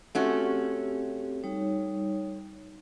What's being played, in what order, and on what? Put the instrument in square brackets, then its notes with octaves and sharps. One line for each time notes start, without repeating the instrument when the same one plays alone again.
[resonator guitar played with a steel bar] A3 C#4 F#4 [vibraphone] C4 G4
[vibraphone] G3 D#4 C#5